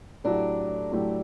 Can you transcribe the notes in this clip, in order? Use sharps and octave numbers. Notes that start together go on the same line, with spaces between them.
A2 F#3 A3 D4 E4 G4
A2 F#3 A3 E4 G4